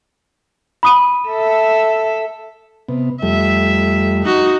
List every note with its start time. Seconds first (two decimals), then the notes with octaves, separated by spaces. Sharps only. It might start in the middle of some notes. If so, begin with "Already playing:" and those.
0.83 B5 D#6 D#7
1.28 A4 E5
2.89 C3 B3
3.22 F2 G3 A3 E5
4.23 D#4 F#4